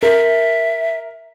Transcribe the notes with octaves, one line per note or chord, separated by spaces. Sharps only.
A#4 E5